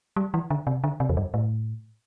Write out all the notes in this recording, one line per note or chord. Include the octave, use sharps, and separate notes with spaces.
G3
E3
D3
C3
D3
C3
E2
G2
A2